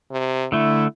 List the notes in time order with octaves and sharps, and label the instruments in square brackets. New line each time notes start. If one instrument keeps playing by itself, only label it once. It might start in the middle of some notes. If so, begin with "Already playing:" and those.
[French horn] C3
[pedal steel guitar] D3 A3 [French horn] E4